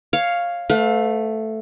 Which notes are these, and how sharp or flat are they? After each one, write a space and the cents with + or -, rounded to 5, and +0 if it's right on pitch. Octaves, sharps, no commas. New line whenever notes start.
C#5 +0 F5 +0
A3 +0 B4 +40 F5 +30